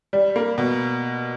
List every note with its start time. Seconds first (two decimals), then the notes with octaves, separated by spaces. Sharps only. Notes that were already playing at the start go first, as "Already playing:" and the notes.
0.13 G3
0.36 A#3
0.58 B2